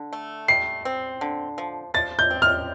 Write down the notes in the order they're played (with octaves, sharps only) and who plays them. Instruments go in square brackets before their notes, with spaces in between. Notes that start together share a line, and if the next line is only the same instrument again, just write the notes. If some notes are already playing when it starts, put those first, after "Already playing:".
Already playing: [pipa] D3
A3
[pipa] G3 [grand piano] C7
[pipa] C4
D3
F3
[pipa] F3 [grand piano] A6
[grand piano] G6
[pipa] C4
[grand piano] F6